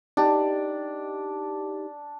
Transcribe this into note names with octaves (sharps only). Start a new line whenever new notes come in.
D4 D#4 G4